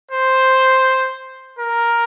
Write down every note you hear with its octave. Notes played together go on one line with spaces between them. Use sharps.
C5
A#4